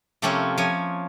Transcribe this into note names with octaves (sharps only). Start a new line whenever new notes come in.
C3 F3 A3 A#3 C#4 F4
F3 C#5 G#5